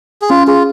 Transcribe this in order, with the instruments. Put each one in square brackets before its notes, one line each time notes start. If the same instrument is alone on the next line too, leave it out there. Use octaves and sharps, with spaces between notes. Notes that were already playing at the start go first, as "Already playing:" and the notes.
[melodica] G#4
[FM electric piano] C#4 [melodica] F4
[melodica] F4 [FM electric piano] G#4